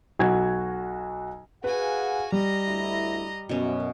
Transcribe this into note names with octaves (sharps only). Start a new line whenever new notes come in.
B1 F#4 G#6
F#4 G#4 B4 F5 F#5 G#5
G3 D#5 A#5
D2 E4
F#2 B2 C#4